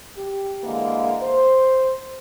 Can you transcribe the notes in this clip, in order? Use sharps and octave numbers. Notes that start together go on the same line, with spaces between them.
G4
D3 E3 G#3 A#3
C5